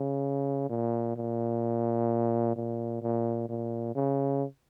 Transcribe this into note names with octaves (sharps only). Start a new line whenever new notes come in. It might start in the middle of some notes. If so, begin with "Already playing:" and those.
Already playing: C#3
A#2
A#2
A#2
A#2
A#2
C#3